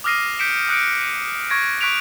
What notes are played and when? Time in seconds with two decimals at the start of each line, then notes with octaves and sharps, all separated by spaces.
0.04 D6 D#6 F6 A#6 C7 D#7
0.39 G6 B6 C#7 D7 E7
0.69 D#6 F#6 C#7 D7
1.01 D#7
1.50 C#6 G#6 A#6 D7
1.81 C#6 F#6 B6 D7 F7